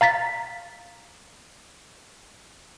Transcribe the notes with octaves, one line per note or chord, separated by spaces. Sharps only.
F5 A#5 A6 B6